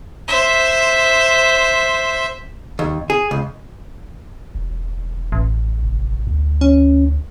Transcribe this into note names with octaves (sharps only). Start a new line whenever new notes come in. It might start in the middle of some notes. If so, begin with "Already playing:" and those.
C5 E5
D#2
G#4
C#2
E1
A1
F1
D2
C#4